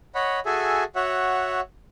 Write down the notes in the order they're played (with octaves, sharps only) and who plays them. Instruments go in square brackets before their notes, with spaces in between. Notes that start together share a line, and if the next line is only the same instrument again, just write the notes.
[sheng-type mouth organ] C#5 D#5 F#5 B5
F#4 G#4 A4 E5 G#5
F#4 C#5 E5 F#5